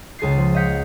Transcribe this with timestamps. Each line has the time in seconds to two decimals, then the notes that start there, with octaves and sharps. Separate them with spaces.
0.19 C#2 G#4 A6 C7
0.37 F3
0.54 D#5 F5 F#5 G6 B6 C#7